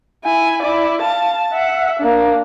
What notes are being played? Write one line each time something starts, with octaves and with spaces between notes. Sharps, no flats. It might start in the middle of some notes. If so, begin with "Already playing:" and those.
E4 G#5
E4 D5
F5 A5
E5 F#5
A#3 D4